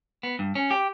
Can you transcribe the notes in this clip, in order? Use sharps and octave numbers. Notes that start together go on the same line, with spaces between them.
B3
G2
C#4
G4